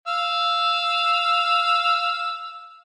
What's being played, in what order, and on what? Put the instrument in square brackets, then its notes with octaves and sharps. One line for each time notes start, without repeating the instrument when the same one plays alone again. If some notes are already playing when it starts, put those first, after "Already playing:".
[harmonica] F5 E6